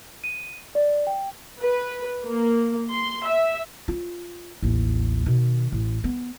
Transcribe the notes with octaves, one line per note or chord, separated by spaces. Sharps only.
D#7
D5
G5
B4
A#3
C6
E5
F4
A1 D#2
B2 D#3
A1
B3